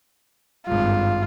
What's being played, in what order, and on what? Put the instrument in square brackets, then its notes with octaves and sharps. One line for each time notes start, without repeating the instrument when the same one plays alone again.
[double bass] G#1 G2 [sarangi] F4